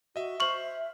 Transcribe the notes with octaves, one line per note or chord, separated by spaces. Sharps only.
F#4 D#5 E5
C5 E5 C#6 F6 F#7